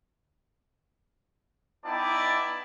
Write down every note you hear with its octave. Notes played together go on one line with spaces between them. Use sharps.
B3 D#4 E4 D5 G5 A5